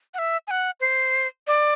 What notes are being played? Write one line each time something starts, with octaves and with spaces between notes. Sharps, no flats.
F#5
E5
G#5
F#5
C5
D5